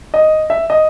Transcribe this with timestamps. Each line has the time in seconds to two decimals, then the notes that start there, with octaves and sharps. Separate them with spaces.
0.14 D#5
0.50 E5
0.70 D#5